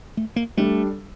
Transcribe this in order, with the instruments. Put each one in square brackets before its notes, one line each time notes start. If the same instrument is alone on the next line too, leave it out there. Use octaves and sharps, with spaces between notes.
[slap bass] A3
A#3
[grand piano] G3 D4 A4 [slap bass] A3